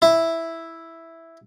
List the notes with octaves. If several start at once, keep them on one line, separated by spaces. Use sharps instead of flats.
E4